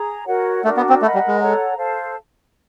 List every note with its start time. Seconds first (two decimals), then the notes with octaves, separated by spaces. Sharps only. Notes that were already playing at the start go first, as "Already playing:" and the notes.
Already playing: G#4 A#5
0.28 F#4 A#4 C#5 F#5
0.64 A3 D4 F#4 A#4
0.77 B3
0.89 C4
1.02 A3 A#4 D#5 F#5 B5
1.14 G3
1.28 G#3
1.39 A4 C#5 F#5 A#5
1.77 A4 C5 F5 A5